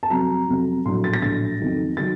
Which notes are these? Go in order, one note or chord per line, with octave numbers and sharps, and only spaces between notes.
A5
F2 C3 F#3 A#5
F2 C3 F#3
A#1 A2 F#3 C6
A6
A#6
A#1 A2 F#3 A6
F2 D#3 F#3
D#3 F#3 A6